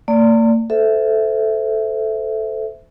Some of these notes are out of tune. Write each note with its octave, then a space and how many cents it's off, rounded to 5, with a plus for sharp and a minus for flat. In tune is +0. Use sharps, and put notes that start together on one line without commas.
A#3 -45 D5 -15
A4 +0 C5 -25 E5 +0